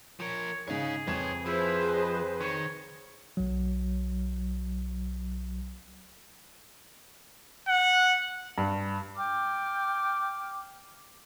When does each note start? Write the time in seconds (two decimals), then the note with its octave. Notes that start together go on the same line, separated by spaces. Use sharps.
0.20 F3 A#4 C#5
0.68 G#2 C#3 G#4 C#5 F5
1.07 F2 B4 C#5 G#6 E7
1.46 F3 E4 G#4 B4 C5
1.91 D#5
2.41 D#3 C#5
3.37 B1 F#3
7.68 F#5
8.58 G2
9.16 G5 D6 F6